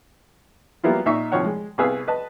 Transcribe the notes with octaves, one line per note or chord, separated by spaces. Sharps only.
F#3 G3 A#3 B3 E4 F4
A#2 D#4 E5 C#6
C2 D#3 F3 C#5 F#5
G#3
C2 B3 G#4 B4 F5 E6
B4 D#5 A5